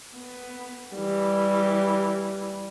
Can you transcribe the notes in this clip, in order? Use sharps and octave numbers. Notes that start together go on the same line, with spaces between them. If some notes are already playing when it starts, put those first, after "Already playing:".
B3
E3 G3